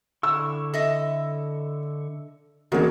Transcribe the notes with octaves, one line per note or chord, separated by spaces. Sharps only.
D3 E4 C#6 E6
A4 D#5 E5
E1 D#3 G#3 A#3 F#4